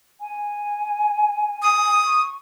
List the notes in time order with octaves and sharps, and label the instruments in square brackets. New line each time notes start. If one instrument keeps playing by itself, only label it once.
[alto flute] G#5
[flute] D#6
[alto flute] C#6